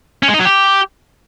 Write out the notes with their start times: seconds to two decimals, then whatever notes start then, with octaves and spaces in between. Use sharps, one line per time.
0.23 C#4
0.28 G#3
0.34 D#4
0.40 F#3
0.45 G4